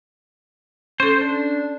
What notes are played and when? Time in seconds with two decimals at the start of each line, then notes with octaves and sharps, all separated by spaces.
1.00 C#4 A4 C5
1.21 D4